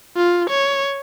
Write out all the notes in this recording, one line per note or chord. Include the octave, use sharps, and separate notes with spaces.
F4
C#5